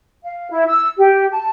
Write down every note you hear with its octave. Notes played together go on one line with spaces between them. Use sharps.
F5
E4
E6
G4
A5